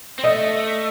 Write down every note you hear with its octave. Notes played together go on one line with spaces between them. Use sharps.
C4
A3 D#5